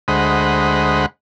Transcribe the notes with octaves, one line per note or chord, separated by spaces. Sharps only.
D2 G#3 C5 D#5 F#5 B5